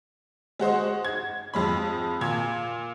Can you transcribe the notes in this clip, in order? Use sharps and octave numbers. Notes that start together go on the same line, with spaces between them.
G#3 F#4 C5 D#5
G#6
F2 G#3 B5
A#2 G#6